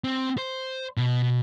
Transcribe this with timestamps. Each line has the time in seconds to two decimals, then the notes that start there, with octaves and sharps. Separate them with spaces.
0.04 C4
0.38 C5
0.97 B2